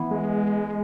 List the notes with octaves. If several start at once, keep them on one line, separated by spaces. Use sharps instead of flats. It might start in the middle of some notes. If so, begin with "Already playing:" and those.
Already playing: E3 B3
G#3